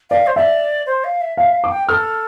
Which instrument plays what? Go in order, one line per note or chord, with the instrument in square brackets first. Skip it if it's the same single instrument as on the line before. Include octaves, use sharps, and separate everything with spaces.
[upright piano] D5 [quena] F5
[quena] C5
[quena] D5 [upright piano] E5
[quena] C5
F5
E5
[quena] E5 [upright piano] F5
[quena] F5
[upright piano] D6
[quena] G5
[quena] A4 [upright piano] F6